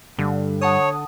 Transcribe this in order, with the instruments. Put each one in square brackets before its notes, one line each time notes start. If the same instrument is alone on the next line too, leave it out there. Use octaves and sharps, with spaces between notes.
[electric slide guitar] G2 [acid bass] D3
[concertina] C#5 [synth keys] F#5 A5 D#6